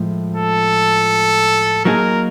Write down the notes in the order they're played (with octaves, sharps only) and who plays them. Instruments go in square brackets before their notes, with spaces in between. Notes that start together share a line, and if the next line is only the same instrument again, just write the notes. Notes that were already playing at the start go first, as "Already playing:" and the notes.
Already playing: [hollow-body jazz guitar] A2 F3 G#3
[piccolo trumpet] A4
[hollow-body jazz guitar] F#3 A#3 D#4 G#4 [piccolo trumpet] A#4